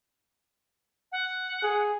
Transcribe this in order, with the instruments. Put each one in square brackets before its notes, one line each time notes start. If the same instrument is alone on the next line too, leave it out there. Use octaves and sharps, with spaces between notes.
[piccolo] F#5
[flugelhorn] G#4